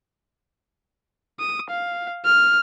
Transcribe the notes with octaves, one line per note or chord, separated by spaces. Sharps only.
D#6
F5
F6